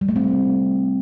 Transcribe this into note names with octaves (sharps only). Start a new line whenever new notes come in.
G3
A3
C4